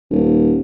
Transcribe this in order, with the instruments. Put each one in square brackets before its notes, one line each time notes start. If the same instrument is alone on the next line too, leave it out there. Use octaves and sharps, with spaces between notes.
[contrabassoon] D#1